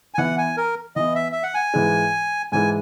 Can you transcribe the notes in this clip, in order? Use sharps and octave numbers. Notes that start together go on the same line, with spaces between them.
G#5
E3 B3 E4 F#5
G#5
A#4
E3 B3 E4 D#5
E5
E5
F#5
G#5
G#2 E3 G#3
G#2 E3 G#3 G#5